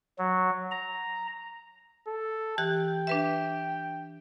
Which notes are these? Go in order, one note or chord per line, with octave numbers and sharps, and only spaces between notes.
F#3
A#5
A4
E3 G4 G5 F#6
D4 B4 E5